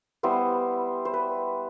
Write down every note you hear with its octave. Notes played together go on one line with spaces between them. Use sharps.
G3 B3 E4 C5
C5
B4